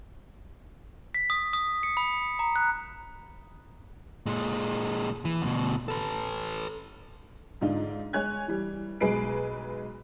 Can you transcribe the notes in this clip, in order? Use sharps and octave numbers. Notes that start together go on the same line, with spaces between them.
B6
D#6
D#6
C#7
B5
A#5
F#6
A#2 G#3
E3
D2 B2
A4 B4
G#2 D3 D4 D#4 F4
G#3 C#5 G#5 F#6 G#6
E3 G3
B1 G#3 G#4 B4 C7 D7